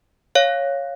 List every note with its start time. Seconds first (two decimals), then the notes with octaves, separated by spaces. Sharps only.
0.35 C#5 F5